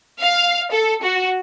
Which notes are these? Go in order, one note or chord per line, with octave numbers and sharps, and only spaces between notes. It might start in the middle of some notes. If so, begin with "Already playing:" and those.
F5
A4
F#4